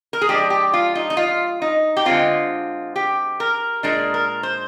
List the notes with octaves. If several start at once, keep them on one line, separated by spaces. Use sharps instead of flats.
A#4
G#4
F3 G#3 D4 G4
G4
F4
D#4
D#4
F4
D#4
G4
D3 G#3 C4 F4
G4
A#4
A#2 G#3 D4 A#4
A#4
C5